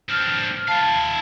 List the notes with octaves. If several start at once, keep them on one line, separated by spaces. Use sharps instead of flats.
C4 D4 F6
E4 F5 A5